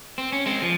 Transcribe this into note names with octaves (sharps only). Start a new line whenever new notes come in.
C4
C#4
G#3 C4
F3